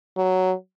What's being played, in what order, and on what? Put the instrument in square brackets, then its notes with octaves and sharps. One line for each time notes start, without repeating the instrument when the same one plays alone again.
[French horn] F#3